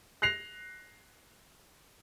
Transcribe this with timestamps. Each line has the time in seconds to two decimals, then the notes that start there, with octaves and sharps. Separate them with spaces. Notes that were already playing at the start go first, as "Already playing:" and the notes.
0.22 F#6 A#6 C7 F7